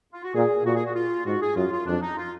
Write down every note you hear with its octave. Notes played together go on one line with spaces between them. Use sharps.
F4
F#4
A#2 G#4
A#2 F#4
G#4
F#4
F4
G#2 F#4
G#4
F#2 F4
F4
F2 D4
D#4
F4